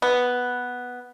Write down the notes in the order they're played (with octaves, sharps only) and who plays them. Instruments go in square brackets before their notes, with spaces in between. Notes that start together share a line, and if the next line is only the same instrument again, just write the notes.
[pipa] B3